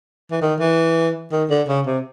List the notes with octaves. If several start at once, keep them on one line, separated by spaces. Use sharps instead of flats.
E3
D#3
E3
D#3
D3
C#3
C3